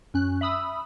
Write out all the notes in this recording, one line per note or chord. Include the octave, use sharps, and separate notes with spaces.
F#2 C#4 F#6
E5 B5 D#6 E6